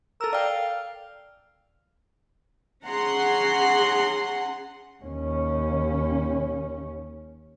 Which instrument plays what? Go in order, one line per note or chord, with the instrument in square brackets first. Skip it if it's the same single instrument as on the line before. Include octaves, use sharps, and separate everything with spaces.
[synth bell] A4 E6 [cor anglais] A#4
[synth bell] D5 G5 [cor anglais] F5
[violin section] C#4 F#5 C6 [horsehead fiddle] G#4 A#5
[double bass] D#2 C#4